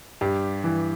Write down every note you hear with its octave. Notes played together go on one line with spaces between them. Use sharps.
G2 G4
E3